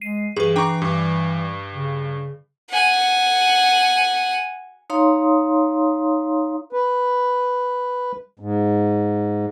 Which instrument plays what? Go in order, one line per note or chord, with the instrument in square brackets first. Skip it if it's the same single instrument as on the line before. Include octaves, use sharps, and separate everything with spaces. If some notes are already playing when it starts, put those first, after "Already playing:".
[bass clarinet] G#3 [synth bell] C7 D#7
[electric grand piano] G2 [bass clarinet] E3 [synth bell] G#4 B4
[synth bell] D4 D6 [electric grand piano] G5 A#5 C#6
[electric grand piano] G2
[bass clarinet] C#3
[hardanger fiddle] F#5 G#5
[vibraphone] D#4 C#5 F5 A#5 C6 D#6
[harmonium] B4
G#2